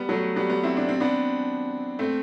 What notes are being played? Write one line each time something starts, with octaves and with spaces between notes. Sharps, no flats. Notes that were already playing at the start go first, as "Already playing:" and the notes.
Already playing: G3 B3
F#3 A3
G3 B3
G3 B3
C4 E4
D4
C4
B3 D4
A3 C4